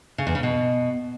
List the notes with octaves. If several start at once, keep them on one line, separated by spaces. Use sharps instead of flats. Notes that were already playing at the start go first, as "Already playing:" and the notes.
C#3
E2
C#3
B2